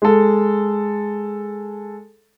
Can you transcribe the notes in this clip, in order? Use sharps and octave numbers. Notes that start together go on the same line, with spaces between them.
G#3 A4